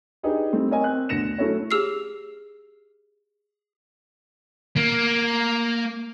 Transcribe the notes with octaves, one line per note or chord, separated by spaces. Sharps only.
D4 D#4 G4 G#4 B4
G3 A3 C4
C4 A#4 C#5 D#5 G#5
C4 F#6
D2 B2 D3 A#6 C#7 E7
F#3 A3 C#4 E4 A4 C#5
G4 G#4 E6 F6 C7
A#3